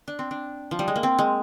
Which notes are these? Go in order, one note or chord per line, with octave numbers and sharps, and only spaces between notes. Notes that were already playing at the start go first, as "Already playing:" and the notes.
D4
C4
D4
F3
G3
G#3
A#3
C4
G#3